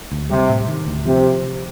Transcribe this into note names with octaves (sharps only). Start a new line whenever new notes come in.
D2
C3 G3
A2
D#3
D2
C3 F3